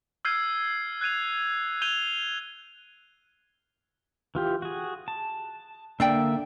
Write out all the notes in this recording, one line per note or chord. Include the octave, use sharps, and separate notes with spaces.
E6 F6 G6 G#6 C7 D#7
F#6 G#6 D#7 F7
G6 D#7 F7 G7
E3 F4 G4
F#4 G#4
A5
D3 A#3 D4 D5 E5 G5